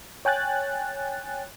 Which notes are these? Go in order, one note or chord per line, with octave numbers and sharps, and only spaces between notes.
C#5 G5 G#5 F#6 A6